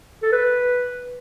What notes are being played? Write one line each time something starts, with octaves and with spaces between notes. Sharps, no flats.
A4
B4